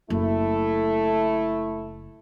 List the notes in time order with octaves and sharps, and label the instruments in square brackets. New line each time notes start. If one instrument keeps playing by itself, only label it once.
[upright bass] F#1 [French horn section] A3 E4